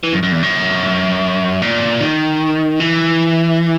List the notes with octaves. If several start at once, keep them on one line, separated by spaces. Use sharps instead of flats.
E3
F#2
F#2
E2
F#2
A#2
D#3
E3